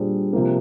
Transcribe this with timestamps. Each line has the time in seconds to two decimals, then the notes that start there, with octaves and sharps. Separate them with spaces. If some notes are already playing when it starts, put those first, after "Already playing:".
Already playing: A#2 G3 D4 G#4 C5
0.33 C3 F3 A#3